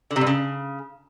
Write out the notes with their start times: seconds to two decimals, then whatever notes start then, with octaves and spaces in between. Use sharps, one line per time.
0.11 D3
0.16 C3
0.21 G2
0.27 C#3